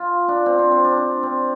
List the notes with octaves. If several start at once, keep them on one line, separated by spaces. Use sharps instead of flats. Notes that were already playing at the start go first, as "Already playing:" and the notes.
Already playing: F4
D4
C4
C4
C4
D4
D4
C4